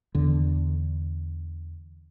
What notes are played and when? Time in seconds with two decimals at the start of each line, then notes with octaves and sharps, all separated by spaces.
0.15 E2 D3